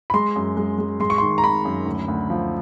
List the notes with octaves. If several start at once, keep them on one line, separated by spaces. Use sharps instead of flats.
B5
G#3 C6
F#2
G#3
G#3
G#3 C6
C#6
D#3 C6
A#5
D#3 B5
F#2
D2
D2
F3